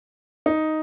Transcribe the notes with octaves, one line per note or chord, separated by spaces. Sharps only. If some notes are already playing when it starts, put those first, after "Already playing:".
D#4